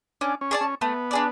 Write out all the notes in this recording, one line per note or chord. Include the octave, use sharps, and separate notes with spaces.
C#4 D4
C#4
G#4 D5 A5
C#4
A3 B3
D4 G#4 D5